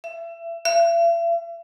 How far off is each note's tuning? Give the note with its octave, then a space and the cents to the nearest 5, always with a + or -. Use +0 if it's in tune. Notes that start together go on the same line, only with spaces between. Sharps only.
E5 +30
E5 +40